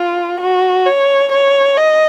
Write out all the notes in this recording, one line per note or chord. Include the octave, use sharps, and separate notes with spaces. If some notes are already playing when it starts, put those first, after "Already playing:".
Already playing: F4
F#4
C#5
C#5
D#5